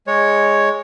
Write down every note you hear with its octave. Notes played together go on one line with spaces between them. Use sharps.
G#3 C#5